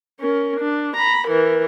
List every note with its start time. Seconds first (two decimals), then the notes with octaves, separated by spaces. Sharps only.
0.20 C#4 A#4
0.59 D4
0.96 A#5 B5
1.27 E3 A#4